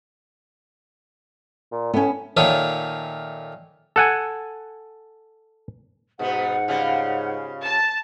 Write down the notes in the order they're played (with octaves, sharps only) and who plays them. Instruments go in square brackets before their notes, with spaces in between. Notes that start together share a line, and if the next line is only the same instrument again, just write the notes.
[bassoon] A#2
[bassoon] A2 [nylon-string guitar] B3 C#4
[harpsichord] A#2 D#3 A3 C#5 F5 D#6
[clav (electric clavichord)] A4 F#5 G#5
[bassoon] G#2 [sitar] B2 B3 D#4 [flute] F#5
[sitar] C#3 G3 F4
[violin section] A5